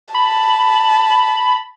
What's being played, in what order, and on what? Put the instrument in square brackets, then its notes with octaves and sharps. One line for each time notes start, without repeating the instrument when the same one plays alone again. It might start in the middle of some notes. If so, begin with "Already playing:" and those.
[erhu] A5 [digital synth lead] B5